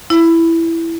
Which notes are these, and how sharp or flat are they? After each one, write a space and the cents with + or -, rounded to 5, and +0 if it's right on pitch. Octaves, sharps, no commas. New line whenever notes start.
E4 +5